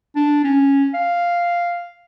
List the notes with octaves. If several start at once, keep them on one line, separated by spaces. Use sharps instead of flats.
D4
C#4
F5